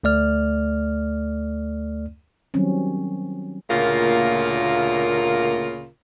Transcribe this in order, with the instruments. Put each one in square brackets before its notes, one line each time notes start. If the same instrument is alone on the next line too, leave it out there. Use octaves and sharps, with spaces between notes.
[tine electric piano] D2 A3 D5 F6
[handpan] D#3 F#3 G3 C4 C#4
[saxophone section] D2 A#2 C#3 A#3 F4 A#4